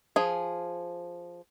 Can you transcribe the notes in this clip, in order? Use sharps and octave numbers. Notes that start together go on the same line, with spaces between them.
F3 G#4